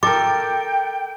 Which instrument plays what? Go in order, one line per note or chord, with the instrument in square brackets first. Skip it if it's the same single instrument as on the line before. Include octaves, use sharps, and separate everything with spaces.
[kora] A4 A#4 [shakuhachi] G5 [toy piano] D6